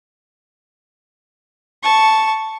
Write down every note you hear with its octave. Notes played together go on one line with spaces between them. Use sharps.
A5 C#6